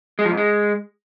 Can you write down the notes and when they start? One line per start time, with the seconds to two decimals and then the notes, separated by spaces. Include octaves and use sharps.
0.19 G#3
0.25 F3
0.31 G#2
0.37 G#3